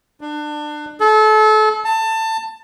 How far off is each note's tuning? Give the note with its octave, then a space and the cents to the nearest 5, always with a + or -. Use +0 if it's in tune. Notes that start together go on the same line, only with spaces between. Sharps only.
D4 +25
A4 -30
A5 +20